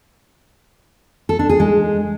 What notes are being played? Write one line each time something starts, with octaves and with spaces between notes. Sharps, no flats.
A4
D4
G#4
G#3